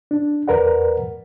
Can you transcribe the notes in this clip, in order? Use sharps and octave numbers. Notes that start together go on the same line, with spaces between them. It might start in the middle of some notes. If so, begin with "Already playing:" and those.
D4
E2 A#4 B4 D5 F#5